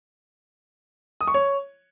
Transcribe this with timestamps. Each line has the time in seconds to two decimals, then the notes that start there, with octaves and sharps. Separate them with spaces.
1.21 D#6
1.27 C#6
1.34 C#5